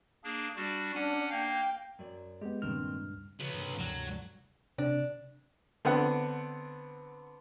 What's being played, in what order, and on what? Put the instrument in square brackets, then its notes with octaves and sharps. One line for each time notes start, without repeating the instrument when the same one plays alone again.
[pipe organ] A#3 D4 G#4
G3 D4 F#4
[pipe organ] C#4 F#5 G#5 [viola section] D4
[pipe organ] A#3 F5 [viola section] G5
[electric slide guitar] F#2 F#3 D5
[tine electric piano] G#3 B3 [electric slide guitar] G4
[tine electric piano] C#2 G2 F6 [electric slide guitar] A#2 D#3 C4
[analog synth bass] C#3 [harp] E3 [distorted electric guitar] F#3 B3
[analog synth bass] G2 [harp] C3 A#3
[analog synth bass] D2 [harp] G2 A3 F#6 [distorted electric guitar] F#3
[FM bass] C3 [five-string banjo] D4
[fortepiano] D3 B3 C4 F#5